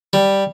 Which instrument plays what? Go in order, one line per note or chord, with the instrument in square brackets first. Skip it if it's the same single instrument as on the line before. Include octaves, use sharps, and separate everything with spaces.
[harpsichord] G3